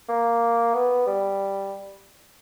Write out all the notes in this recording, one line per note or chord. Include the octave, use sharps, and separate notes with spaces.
A#3
B3
G3